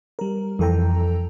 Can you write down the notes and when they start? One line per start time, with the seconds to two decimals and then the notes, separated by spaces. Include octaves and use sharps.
0.19 G3 A#4
0.59 F2 E3 A4 G5 A#5